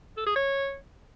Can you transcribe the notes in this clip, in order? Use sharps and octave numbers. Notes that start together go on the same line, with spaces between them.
A4
G#4
C#5